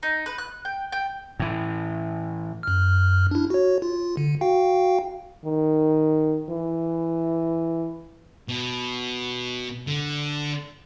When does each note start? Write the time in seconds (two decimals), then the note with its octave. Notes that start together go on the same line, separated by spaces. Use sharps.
0.03 D#4
0.26 B4
0.38 F#6
0.65 G5
0.92 G5
1.39 A2 E3
2.63 F#2 F6
3.31 D4 E4
3.50 F#4 C#5
3.82 F4
4.17 D3
4.41 F#4 F5 G5
5.45 D#3
6.49 E3
8.49 B2
9.87 D3